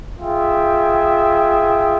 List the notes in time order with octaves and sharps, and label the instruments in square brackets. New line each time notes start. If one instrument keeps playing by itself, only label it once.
[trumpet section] F4 G#4 E5 G5